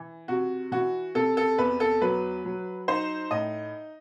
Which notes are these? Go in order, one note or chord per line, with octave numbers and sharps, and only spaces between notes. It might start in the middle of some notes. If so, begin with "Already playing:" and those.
Already playing: E3
C3 F#4
E3 F#4
C3 A4
A4
E2 B4
A4
F#3 B4
F#3
D#4 C5
A2 D#5